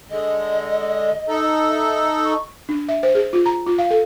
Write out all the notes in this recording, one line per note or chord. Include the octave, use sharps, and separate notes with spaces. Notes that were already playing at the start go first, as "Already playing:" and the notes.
D3 G#3 D#5
D#4 A4
E5
C#6
D4
E5
C5
G#4
F4
A#5
F4
F5
A4